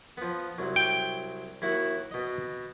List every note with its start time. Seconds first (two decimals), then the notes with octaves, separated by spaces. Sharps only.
0.17 F3 B3
0.58 C2 F#3
0.76 G5
1.62 D#2 E4 F#4
2.11 B2 D#5